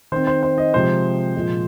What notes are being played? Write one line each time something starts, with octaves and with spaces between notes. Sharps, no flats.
D#3 C4 C5
C5
C5
D#5
C3 F3 G#3 C4 C5
A#2 F3 G#3